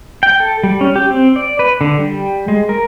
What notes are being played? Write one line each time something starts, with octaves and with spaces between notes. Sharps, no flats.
G5
A4
G3
C#4
G4
C4
D5
B4
D3
G3
G#3
A#4